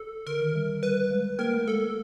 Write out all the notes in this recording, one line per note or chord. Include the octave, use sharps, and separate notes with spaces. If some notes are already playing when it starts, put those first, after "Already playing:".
Already playing: A4
D3 A#4
D#3
G3
G3 B4
G#3
A#3 A#4
A3
G#3 A4